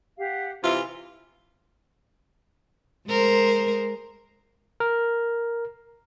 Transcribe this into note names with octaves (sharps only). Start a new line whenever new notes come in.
G4 F5 F#5
C3 E3 F4 C6
G#3 A#4 C5
A#4